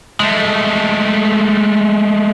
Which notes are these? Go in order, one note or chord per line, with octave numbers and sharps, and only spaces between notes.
G#3 A3